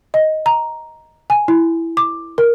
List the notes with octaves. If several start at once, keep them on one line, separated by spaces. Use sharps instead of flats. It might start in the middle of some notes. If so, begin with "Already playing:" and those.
D#5
A#5
G#5
E4
D6
A#4